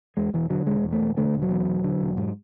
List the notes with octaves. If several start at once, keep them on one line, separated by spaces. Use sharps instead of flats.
E2 G#3
E1 E3
D3 F#3
E1 G#3
E2
A3
E1
D3 A3
E1
F#3
E2
E1
D3
E1
G#2